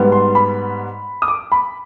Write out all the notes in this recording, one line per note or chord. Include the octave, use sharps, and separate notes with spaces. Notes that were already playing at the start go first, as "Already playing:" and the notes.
Already playing: G#2 G3 B3
C6
B5
D#6
D6
B5